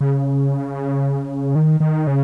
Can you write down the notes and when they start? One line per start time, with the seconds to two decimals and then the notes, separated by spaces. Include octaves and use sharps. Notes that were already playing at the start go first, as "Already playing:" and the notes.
0.01 C#3
1.55 D#3
1.80 D#3
2.07 C#3